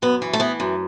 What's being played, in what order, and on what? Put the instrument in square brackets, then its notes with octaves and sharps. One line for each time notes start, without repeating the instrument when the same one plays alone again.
[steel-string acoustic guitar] F#2 B3
E3
A3
E3 B3
F#2